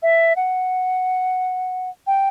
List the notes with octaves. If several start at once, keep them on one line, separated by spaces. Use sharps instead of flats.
E5
F#5
G5